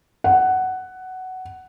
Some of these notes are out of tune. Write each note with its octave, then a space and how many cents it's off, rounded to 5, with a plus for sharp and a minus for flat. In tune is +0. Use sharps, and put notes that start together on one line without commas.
F#5 +10